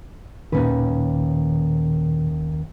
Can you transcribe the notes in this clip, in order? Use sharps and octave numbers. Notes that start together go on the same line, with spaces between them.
D#2 A#2 D#3 C#4 B4